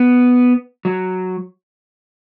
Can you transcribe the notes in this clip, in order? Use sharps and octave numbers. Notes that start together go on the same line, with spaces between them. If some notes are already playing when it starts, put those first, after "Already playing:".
Already playing: B3
F#3